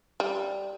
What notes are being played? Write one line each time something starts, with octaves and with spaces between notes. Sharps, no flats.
G3